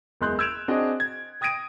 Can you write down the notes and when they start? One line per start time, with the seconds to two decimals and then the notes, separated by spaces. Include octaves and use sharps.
0.21 F#1 E2 G#3 C6 F#6 G6
0.39 E6 G6 G#6 D7 E7 F7
0.68 C4 D4 F#4 G#4 D#5
1.00 G#6
1.41 G5 D#6 G#6 A#6 D7 D#7